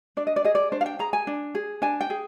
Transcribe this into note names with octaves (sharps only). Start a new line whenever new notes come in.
D4 D5
D#5
D5
G#4 D#5
D5
D4 C5
F5
G5
G#4 A#5
G#5
D4
G#4
D4 G#5
G5
G#4